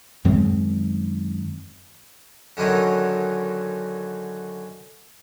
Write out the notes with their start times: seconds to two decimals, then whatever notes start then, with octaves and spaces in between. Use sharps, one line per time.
0.24 F#2 D#3 G#3 C4
2.57 F#2 D3 D#3 F#3 C#4 D#4